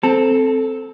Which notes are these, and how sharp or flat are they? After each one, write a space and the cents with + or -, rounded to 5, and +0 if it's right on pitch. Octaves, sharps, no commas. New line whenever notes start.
C4 +0 A4 +0 A5 +0